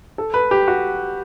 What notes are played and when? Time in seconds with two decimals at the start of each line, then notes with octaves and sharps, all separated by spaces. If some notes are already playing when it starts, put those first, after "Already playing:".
0.18 A4
0.34 B4
0.51 G4
0.68 F#4